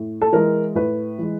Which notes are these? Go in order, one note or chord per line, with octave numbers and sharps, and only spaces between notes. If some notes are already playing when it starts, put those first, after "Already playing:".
Already playing: A2
A4
E3 G#3 A#4
A2 B4
E3 G#3